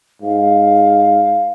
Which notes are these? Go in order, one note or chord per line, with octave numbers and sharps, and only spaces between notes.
G#2 F5